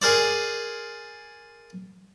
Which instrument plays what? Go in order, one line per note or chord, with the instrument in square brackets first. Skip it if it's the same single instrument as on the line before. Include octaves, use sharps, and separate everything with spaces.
[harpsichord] G#4 A#4 C5 D5